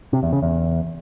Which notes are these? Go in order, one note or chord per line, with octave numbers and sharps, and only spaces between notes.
C3
E2
C#3
E2